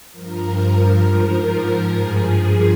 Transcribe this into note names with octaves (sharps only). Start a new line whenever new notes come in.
G2 F3 A#4
G#2 F3 A#4
G2 F3 G#4
G#4